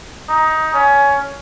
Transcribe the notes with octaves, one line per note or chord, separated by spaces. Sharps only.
D#4
C#4